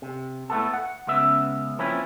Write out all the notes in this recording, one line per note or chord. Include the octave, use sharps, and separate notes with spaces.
C3
A2 A3 B3 A4
F#5
C#2 C#3 B3 E5
F3 A#3 C4 C#4 E4 B4